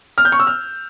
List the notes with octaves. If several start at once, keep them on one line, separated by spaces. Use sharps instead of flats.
F6
G6
C#6
E6
F6